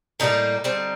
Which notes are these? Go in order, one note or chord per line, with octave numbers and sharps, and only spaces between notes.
A2 G3 A#3 D#4
D3 G3 C4